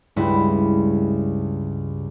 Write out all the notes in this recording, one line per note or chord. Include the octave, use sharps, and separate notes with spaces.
C#2 G2 E4